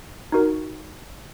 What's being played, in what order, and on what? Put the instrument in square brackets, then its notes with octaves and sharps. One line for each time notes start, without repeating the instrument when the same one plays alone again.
[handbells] D#4 F#4 A#4